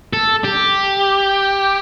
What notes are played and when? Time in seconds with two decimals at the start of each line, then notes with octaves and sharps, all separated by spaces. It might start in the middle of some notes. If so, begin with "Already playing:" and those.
0.13 A4
0.44 G4